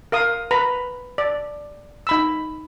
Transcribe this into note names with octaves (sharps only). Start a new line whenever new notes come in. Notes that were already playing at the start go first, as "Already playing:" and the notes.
A#4 F5 D#6
B4 A#5 B5
D5
D#4 B5 E6